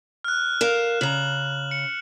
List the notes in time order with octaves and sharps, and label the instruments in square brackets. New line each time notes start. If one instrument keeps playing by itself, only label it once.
[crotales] F6 F#6
[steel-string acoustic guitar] A#4 F5 [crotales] E7
[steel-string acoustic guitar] C#3 A#5 [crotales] F#7
[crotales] C#7